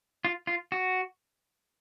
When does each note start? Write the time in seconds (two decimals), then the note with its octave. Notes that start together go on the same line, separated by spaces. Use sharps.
0.25 F4
0.47 F4
0.72 F#4